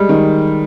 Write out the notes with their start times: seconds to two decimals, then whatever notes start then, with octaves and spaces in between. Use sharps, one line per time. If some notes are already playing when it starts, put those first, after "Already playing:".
Already playing: G3 G#3
0.09 D#3